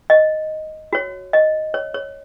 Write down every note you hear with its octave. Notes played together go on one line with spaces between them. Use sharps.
D#5
F#4 C#5
D#5
C#5
C#5